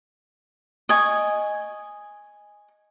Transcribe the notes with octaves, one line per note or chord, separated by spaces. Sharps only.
D#5 G#5 C#6